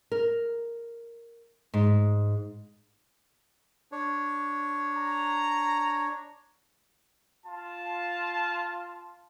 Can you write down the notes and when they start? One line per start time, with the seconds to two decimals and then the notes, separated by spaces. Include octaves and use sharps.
0.11 A#4
1.74 G#2
3.92 D4 C#5
4.93 A#5
7.47 F4 A5